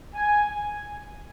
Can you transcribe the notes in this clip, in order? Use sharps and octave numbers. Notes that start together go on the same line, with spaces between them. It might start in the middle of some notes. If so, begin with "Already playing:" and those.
G#5